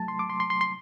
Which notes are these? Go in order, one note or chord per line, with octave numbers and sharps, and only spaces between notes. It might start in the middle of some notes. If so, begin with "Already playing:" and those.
Already playing: F#3 A3 A5
C6
D6
C6
C6
C6
C6